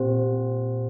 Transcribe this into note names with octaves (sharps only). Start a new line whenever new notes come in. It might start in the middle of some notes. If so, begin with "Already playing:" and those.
Already playing: A#2 C4 G4 C5